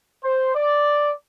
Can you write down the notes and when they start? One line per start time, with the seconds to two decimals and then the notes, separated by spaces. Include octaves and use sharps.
0.24 C5
0.55 D5